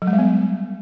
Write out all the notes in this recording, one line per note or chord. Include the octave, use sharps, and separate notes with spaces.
F#3
G#3
G3
B3